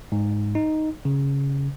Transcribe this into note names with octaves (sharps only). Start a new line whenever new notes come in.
G#2
D#4
C#3